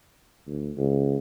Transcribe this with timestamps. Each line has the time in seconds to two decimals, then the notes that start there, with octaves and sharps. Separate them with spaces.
0.47 D2
0.77 C#2